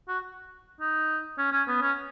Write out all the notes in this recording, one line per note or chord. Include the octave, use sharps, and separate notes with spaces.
F#4
D#4
C#4
C#4
B3
C#4